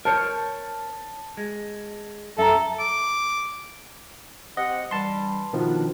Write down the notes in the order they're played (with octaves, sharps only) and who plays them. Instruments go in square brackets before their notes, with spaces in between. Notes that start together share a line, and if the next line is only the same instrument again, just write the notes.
[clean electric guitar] A#4 C5 C#5 [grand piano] A5
[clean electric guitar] G#3
[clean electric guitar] F#2 [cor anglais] A4 [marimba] E5 A#5
[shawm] D6
[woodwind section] C4 G4 F#5 [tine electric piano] D#5
[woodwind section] G2 E3 G3 [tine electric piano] A5 C6
[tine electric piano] B2 D#3 F3 [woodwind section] B3 D4